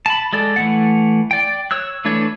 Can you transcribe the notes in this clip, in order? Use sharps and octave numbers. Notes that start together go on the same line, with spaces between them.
A5 B5
G#3 A4 D5
E3 A3 F#5
D5 G5
C#5 E6 F#6
E3 A3 D4 C#5